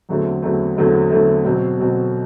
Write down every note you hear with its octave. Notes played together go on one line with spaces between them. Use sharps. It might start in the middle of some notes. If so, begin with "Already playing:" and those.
E2 D3 F#3 A3 C4
E2 D3 F#3 A3 C4
E2 D3 F#3 A3 C4
E2 D3 F#3 A3 C4
B2 F#3 C4
B2 F#3 C4